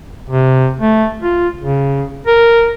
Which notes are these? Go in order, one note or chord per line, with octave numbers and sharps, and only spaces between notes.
C3
A3
F4
C#3
A#4